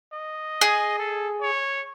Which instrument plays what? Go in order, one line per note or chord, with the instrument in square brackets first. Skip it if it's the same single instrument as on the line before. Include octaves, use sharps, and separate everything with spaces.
[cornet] D#5
[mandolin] G#4
[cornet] A4
C#5